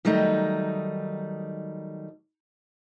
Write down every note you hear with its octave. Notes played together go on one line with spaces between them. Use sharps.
D#3 F#3 G3 A3 D#4